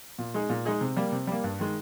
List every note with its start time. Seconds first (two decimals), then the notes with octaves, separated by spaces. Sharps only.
0.18 A#2
0.34 G#3 D#4 G#4
0.49 A#2
0.65 G#3 D#4 G#4
0.81 C3
0.96 G3 A#3
1.12 C3
1.27 G3 A#3
1.44 G2
1.59 D#3 G#3